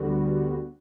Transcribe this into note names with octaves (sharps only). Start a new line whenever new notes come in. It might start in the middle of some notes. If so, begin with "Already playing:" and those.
Already playing: D2 D3 G3 B3 F#4